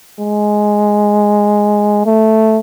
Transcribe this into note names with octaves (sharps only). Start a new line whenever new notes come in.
G#3
A3